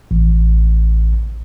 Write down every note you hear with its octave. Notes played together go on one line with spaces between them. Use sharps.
A1